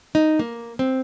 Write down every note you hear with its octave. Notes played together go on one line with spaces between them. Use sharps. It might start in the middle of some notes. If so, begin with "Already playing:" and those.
D#4
A#3
C4